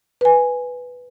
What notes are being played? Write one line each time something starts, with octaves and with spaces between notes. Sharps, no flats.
B4 G#5